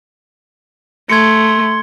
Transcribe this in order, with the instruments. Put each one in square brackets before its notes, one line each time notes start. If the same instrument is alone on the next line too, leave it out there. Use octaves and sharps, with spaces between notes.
[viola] A3 [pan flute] C6 [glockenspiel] G#6 C#7